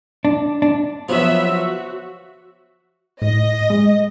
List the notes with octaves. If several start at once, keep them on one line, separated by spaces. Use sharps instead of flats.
D4
D4
F3 F#3 B3 E5
F#4
A2 D#5
G#3